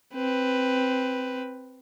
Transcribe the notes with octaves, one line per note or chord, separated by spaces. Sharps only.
C4 B4